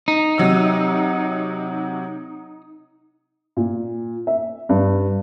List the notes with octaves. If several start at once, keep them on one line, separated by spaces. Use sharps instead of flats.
D#4
C3 F#3 E6
A#2
E5
G2